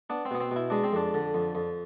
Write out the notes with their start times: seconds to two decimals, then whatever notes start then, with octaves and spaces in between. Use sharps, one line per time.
0.10 B3 D4
0.25 C4
0.31 B2 B3
0.40 C4
0.51 B2 E4
0.70 G#3 D4
0.84 C4
0.93 F2 D4
1.14 D3
1.34 F2
1.55 F2